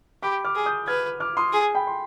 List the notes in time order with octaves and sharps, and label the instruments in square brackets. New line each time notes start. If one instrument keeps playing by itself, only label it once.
[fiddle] G4 [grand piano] B5 D6
[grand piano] D6 F6
[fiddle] G#4
[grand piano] D#6 G6
[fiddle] B4 [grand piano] F6 G#6
[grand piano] D6 F6
C6 D#6
[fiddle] G#4
[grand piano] G5 B5
C6